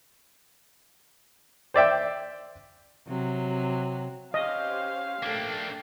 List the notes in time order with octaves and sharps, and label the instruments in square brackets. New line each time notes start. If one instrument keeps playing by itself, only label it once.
[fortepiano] C5 D5 E5 G5
[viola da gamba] C3 F#3
[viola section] C#4 G4 C5 [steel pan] D#5 [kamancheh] F5
[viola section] A3 A4 G5 [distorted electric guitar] A#3 D4